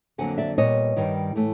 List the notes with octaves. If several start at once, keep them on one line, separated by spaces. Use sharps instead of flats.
F2 D3 F#3 A#3 F#5 G#5
D5 E5
A#2 G3 B3 C#5 D#5
G2 D#3 G3
A2 E3 A3